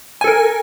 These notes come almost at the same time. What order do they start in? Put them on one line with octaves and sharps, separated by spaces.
G#5 A4 A#4